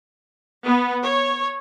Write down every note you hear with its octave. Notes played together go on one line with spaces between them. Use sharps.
B3
C#5